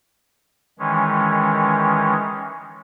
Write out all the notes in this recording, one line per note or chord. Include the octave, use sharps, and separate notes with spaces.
D#3 E3 G#3 C#4